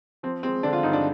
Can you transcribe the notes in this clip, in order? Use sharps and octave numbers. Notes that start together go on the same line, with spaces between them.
F3 C4
G#3 C4
D3 D4
F4
G2 D#4
D4